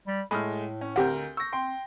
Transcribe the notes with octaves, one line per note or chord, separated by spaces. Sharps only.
G3
A2 G#3 A3 B5 D#6 F6
C#4
D2 C4 G4 A#4 F#5 G6
C#6 E6 A#6
C4 G5 C6